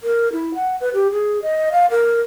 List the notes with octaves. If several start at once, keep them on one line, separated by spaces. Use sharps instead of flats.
A#4
E4
F#5
B4
G4
G#4
D#5
F5
A#4